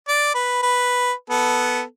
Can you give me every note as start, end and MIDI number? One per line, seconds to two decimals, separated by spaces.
0.08 0.32 74
0.35 0.60 71
0.62 1.12 71
1.30 1.82 59
1.30 1.82 69